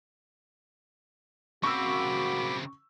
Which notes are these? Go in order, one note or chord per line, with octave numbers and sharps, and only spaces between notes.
C#3 A#3 C4 F#4 B5 C#6 D6 E6